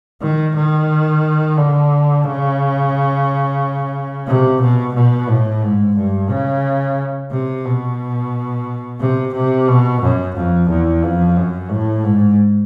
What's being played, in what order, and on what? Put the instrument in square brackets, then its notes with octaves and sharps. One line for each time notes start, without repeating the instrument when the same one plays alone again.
[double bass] D#3
D#3
D3
C#3
C3
B2
B2
A2
G#2
G2
C#3
C3
B2
C3
C3
B2
F#2
F2
E2
F2
F#2
A2
G#2